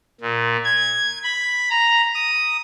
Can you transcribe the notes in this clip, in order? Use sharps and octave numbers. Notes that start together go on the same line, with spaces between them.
A#2
G#6
B5
A#5
D#6